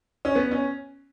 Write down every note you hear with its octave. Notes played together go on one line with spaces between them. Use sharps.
C#4
B3
C#4